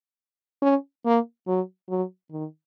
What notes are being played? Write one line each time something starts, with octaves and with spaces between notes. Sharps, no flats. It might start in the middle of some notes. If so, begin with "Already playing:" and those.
C#4
A#3
F#3
F#3
D#3